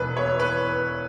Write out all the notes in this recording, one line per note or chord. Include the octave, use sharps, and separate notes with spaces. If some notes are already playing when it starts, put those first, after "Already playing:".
Already playing: E1 E2 E3 B4
C#5
B4